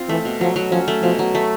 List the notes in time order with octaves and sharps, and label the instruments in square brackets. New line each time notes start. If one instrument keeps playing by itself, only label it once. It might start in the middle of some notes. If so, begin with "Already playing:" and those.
Already playing: [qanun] C4 F4
[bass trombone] E3 [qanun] A3
[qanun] B2
[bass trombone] F3 [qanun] F#3
[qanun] F#3
[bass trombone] F3 [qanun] C#4
[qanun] A3
[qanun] B2 [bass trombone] F3
[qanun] F#3
A3